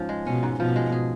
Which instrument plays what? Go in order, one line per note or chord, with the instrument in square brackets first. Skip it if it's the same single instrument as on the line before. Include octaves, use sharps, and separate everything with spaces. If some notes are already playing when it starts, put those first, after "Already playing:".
Already playing: [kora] G#2 F3 C#4
G#3
[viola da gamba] B2 [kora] C#4
[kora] G#2
[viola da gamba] B2 [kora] F3
[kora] G#3
G#4